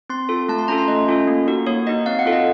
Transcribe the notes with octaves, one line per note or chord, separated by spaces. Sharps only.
C4 C6
F4 A4
A3 A5
C6
C#4 F4 A4 A#5
C6
A3 D#5
C#4 F4 A4
A#3
D#4 F#4
A#3 C#5
D#4 F#4 D#5
C4 F5
F#5
F4 A4
D#5